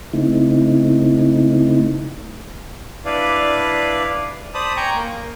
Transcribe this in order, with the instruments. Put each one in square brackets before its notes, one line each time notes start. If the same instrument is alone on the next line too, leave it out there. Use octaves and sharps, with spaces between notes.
[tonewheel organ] C#3 A3 C4 D#4 E4
[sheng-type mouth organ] D4 E4 B4 D5 F5
C5 D5 A5 B5 D#6
G5 G#5 A#5 C#6
A#3